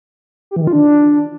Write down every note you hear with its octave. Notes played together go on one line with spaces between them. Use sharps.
G4
E3
D#3
F4
D4